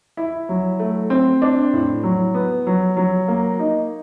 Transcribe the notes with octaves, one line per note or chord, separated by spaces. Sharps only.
E4
F#3
A3
C4
D4
A2
F#3
B3
F#3
F#3
A#3
D#4